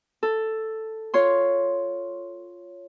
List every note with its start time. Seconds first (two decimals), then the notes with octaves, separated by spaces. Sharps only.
0.23 A4
1.14 F4 C#5 C6